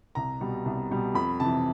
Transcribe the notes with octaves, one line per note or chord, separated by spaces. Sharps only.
C2 A#5
B2 G3
C2
B2 G3
F2 B5
C3 E3 A5